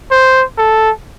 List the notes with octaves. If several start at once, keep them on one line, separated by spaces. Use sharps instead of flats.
C5
A4